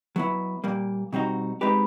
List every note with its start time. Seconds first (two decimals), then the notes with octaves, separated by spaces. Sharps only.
0.16 F#3 B3 E4
0.64 A#2 G3 A#3
1.13 B2 G3 C4 D#4 F#4
1.61 G#3 C4 D#4 G4 B4